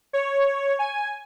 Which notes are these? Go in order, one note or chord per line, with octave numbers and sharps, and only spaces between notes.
C#5
G#5